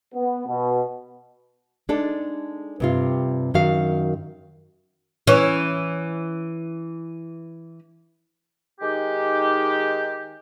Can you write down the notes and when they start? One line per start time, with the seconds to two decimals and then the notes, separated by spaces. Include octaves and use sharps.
0.14 B3
0.48 B2
1.89 G#3 D4 D#4 A4
2.80 G2 C3 F4
3.54 F#2 D#3 F#4 F5
5.27 E3 C#4
8.80 D#3 G#3 D#4 G4